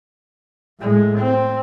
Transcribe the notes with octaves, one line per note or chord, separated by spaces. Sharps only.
A2 G#3
C4